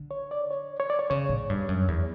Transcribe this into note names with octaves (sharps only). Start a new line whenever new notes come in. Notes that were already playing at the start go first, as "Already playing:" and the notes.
Already playing: D3
C#5
D5
C#5
C#5
D5
C#5
C#3 C#5
A2
G2
F#2
E2